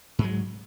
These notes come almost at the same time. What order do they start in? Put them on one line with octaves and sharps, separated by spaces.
G#2 G#3 F#3